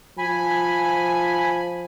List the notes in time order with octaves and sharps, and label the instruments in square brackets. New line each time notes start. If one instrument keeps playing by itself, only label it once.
[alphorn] F3 [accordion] G#5 B5